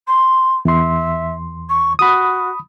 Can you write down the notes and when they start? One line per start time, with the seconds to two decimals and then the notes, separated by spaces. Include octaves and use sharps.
0.07 C6
0.65 E2 E5 C6
1.69 C#6
1.99 F#4 B5 D#6